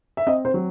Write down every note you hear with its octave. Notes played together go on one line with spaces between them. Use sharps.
E5
C4 D#5
C5
F#3